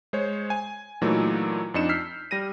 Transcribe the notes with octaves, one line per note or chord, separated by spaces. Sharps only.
G#3 C5 C#5
G#5
A#2 E3 F#3 A3 D#4
F2 D4 D#4 C#7 E7
E6 F6 G6 B6 C7
G3 A#6 D#7